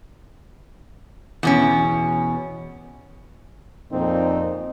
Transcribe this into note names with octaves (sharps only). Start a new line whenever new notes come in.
E2 B2 C#4
F2 A#2 C4 D#4